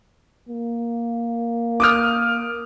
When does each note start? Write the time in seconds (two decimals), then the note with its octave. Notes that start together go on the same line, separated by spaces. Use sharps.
0.49 A#3
1.80 D6 D#6 F6